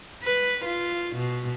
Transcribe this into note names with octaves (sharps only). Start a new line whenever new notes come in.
B4
F4
B2